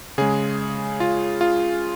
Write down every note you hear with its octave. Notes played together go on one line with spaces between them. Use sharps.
C#3 G#3 G#4
F4
F4